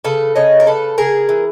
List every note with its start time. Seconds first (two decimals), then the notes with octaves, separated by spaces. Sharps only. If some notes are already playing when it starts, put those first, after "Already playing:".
0.05 C#3 A4 B4
0.36 C#3 C#5 D#5
0.60 A#4
0.66 C#3 A4 B4
0.98 C#3 G#4 A#4
1.29 E3